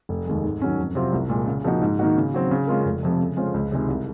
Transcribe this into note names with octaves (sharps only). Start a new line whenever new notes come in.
F1
D#2 D#3 G#3
G#2
D#3 F#3 C#4
F2
C3 F#3 C4 F4
C2
A#2 G#3
C#3
F3 A#3 D#4 F#4
G#2
D#3 A#3 D#4 F#4
C#3
F#3 C4
C#3
G#3 C#4 F4 A#4
F1
F2 C3 F3
C#3
G#3 C#4 F4 C5
C#2
C3 D#3 G#3 D#4
C2